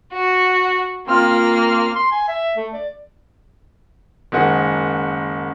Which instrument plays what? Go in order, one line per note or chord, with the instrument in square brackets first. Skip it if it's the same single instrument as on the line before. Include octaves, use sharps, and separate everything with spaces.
[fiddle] F#4
[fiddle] A#3 F6 [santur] C4 F4
[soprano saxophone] C6
G#5
E5
A3
D5
[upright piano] F#1 D#3 G#3 F#5